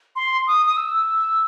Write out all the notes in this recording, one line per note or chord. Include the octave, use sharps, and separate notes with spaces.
C6
D#6
D#6
E6